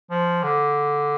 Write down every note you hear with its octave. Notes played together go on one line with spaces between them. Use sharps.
F3
D3